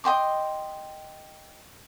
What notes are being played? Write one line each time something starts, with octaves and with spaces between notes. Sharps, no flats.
D#5 G5 C6 D6